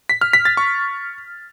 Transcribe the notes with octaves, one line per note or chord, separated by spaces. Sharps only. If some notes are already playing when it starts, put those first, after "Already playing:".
B6
F6
B6
A6
C#6